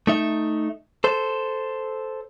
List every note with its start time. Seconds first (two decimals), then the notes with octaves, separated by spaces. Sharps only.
0.07 A3 D#4 E5
1.04 A4 C5